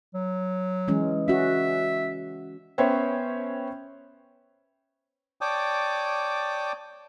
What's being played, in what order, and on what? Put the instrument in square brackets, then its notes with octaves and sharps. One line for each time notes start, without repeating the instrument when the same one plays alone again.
[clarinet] F#3
[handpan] E3 G#3 C#4
[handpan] C#4 F#4 [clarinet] E5
[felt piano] B3 C#4 C5 C#5 E5 G5
[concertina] C#5 D5 G5 A5 D6 D#6